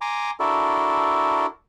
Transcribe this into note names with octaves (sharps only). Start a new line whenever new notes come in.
G#5 A#5 C6 D6
D4 E4 F#4 A4 A#4